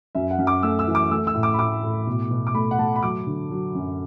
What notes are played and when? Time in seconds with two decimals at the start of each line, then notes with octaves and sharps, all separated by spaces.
0.15 F#2 E5
0.31 F#5
0.39 F#2
0.47 D6
0.63 A3 E6
0.79 E6
0.87 E3
0.95 D6
1.11 A3 E6
1.27 E6
1.34 A2
1.43 D6
1.54 B5
1.59 A2 D6
1.83 A2
2.07 B2
2.31 B2
2.47 D6
2.55 A3 B5
2.71 F#5
2.79 A3 A5
2.96 B5
3.03 F#3 D6
3.27 D3
3.51 F#3
3.75 F#2